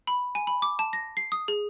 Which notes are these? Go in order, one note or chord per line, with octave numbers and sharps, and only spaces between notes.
B5
G#5
B5
D6
A5
A#6
C7
D#6
G#4